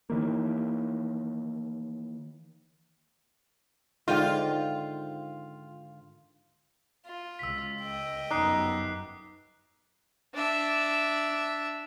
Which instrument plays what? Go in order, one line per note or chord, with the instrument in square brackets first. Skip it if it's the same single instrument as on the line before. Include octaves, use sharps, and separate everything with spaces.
[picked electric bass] D#3 E3 A#3
[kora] G#2 D3 D#3 [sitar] F4 [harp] C5 F5 G5
[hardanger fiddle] F4
[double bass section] C#2 [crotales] E6 B6
[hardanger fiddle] D#5 G5
[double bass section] G1 F#2 B3 [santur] D#4 [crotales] D6 F#6 C7
[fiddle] D4 E5